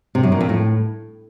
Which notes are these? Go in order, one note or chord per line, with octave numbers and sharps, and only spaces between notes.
C3
F#2
A#2
F2
A2